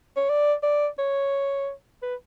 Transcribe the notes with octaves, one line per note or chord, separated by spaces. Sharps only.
C#5
D5
D5
C#5
B4